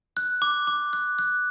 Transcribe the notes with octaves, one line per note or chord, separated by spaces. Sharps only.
F#6
D6
D6
F#6
F#6